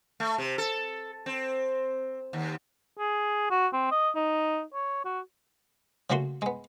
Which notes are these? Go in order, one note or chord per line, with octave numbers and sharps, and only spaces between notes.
A3
C3
A4
C4
D#2
G#4
F#4
C4
D#5
D#4
C#5
F#4
C#3 F#3 A3 A#3 F#4 C6
G#3 B3